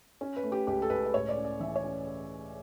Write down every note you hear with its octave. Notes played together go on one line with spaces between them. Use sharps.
C#4
B4
A3
G4
C#2 G4
A4
C#2 B4
B4
A2 C#5
D5
C#4
D5
E3 E5
C#5
C#4